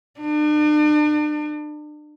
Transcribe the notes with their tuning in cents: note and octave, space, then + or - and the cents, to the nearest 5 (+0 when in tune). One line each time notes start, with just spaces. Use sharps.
D4 +40